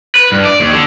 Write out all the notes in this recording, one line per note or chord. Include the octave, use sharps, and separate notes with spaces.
B4
G2
D5
D#2
D3